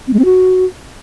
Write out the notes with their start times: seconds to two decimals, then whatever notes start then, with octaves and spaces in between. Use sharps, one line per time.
0.07 C4
0.13 G#3
0.19 C4
0.25 F#4